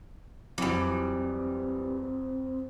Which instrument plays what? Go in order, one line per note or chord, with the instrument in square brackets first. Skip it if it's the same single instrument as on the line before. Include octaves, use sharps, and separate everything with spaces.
[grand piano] F2 F#3 [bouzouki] E3 G3 [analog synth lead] C4